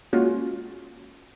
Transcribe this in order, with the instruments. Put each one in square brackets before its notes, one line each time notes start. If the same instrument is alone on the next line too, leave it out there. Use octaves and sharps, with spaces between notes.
[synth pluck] G#3 A#3 C#4 F4 F#4